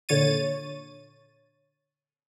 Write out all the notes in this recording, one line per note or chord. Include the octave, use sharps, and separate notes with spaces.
A#2 D3 C#5 A6 D#7